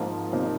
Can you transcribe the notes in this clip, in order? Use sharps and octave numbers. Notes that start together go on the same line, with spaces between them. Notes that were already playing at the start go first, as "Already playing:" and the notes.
Already playing: G#2 F3 A#3
C3 F3 A#3 D#4